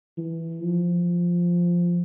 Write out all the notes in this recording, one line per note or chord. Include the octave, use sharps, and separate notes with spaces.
E3
F3